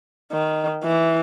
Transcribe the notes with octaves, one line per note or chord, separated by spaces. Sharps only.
D#3
E3